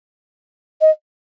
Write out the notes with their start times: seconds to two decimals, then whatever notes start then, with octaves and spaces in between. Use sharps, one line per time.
0.81 D#5